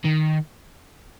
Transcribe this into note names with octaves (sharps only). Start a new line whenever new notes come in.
D#3